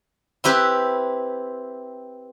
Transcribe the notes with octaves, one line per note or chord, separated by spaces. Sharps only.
C4 E4 G4 B4